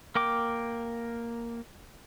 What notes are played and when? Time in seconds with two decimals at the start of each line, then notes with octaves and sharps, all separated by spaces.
0.15 A#3 A#4 G5 D6